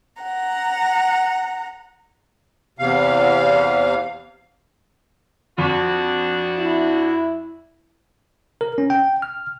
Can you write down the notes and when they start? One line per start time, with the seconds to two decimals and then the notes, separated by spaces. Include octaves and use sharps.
0.22 F#5 A#5
2.79 E2 C3 F5
5.58 F2 D4 F#4
6.59 E4
8.61 A#4
8.78 C#4
8.90 G5
9.22 F6